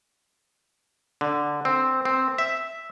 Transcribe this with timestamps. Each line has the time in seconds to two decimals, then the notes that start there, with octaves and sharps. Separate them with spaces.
1.21 D3
1.65 C4
2.05 C4
2.38 E5